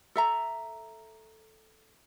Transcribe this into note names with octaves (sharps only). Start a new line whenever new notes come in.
A4 E5 A#5